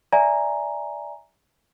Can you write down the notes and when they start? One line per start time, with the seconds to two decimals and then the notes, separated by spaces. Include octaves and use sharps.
0.12 D5 E5 G#5 A#5